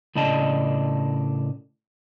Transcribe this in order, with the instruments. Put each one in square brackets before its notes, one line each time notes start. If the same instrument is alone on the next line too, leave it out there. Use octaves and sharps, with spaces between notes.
[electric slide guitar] A2 C#3 D4 D#5 A5